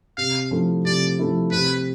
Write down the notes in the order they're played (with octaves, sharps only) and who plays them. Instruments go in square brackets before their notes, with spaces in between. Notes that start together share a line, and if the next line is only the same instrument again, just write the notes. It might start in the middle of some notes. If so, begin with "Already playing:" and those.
[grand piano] C3 [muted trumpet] F5
[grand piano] F3 A3 E4
[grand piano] C3 [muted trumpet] D5
[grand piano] F3 A3 E4
[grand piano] C3 [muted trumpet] B4